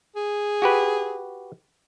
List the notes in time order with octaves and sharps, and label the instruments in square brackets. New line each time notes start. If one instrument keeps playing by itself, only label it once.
[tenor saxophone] G#4
[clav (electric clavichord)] F#4 G4 B4